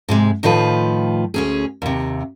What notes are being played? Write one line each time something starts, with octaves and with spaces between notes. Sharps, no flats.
G#2 C3 G#3
A2 D#3 F3 F4 B4
D2 C#4 G#4
D#2 C3